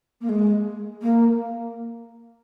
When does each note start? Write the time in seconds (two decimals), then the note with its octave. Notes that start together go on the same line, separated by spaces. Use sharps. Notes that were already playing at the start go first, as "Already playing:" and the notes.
0.21 A#3
0.29 G#3
1.02 A#3